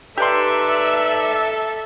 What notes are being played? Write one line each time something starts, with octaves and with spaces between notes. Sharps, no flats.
D#4 G4 A4 B4 D5 E5 C6